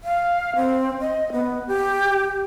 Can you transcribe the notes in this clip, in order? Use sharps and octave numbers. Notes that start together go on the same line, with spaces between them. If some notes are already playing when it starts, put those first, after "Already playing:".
F5
C4
D#5
B3
G4